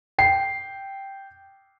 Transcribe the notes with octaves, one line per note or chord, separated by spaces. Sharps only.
G5 C7